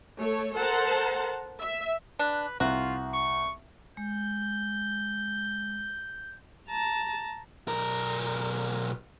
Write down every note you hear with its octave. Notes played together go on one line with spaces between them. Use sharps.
A3 A4 C#5
A4 A#4 C5 F#5 A5 A#5
E5
D4 B4
C2 F4 F#4
C#6
G#3 G6
A5 A#5
B1 A#4